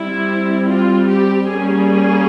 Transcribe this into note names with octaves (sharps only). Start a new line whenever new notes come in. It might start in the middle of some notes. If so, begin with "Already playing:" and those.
Already playing: G3 C4 E4
F4
G4
G3 A#3 C#4 G#4